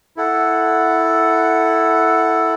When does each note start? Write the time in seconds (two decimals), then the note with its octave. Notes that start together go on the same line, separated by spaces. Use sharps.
0.17 E4 A4 F#5